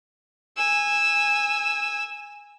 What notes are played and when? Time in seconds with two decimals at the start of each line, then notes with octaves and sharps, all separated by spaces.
0.57 G#5 E6